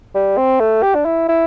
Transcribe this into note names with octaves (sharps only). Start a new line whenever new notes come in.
G3
C4
A3
G4
D4
E4
E4